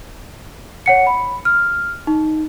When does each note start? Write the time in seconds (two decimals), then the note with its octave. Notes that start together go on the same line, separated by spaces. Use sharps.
0.86 C#5 F#5 C#7
1.07 B5
1.45 F6
2.07 D#4